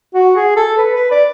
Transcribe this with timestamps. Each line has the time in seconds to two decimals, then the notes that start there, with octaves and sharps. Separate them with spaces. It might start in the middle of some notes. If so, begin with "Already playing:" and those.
0.14 F#4
0.36 G#4
0.56 A4
0.78 B4
0.95 B4
1.11 D5